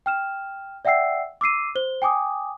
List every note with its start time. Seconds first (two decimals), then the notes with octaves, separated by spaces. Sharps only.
0.06 G5 F6 E7
0.85 D5 E5 F#5 G5 E6 C7
1.41 D6 E6 C7 D#7
1.75 C5 G7
2.02 G5 G#5 D6 D#6